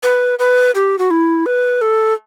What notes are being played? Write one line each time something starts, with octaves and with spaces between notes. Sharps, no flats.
B4
B4
G4
F#4
E4
B4
A4